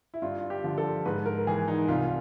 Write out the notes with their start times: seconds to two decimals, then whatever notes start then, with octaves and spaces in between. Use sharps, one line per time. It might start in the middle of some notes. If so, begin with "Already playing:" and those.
0.14 E4
0.22 G2 F4
0.50 G4
0.64 D3 F3
0.78 A4
1.05 G#2 B4
1.26 A#4
1.47 E3 G#4
1.68 D#4
1.88 C2 F4